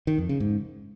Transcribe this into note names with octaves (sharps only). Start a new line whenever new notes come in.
D#3
F2
C#3
G#2